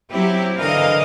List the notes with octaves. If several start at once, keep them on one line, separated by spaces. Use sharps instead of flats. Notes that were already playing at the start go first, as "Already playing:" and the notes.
F#3 C4 E4 G4
D3 E3 A#4 D#5 F5